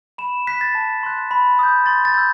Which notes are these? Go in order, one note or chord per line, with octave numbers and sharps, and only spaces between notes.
B5 E7
F#6 B6
A6
A5
C6 F#6
B5
D#6 G6
C6 A6
A6
E6 G6